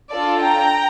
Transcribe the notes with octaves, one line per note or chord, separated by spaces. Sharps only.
D4 F4 A4 D5
G5 A#5